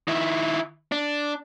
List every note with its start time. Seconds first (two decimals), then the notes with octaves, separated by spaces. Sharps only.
0.08 D#3 E4
0.92 D4